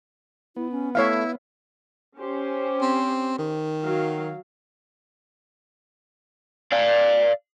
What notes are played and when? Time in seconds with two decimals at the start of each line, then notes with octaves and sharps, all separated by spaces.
0.56 B3 E4
0.71 C#4
0.95 A3 E4 C#5 E5 F5
2.17 C#4 G4 C5
2.82 C4
3.39 D#3
3.82 F#3 F5
6.73 D5 F5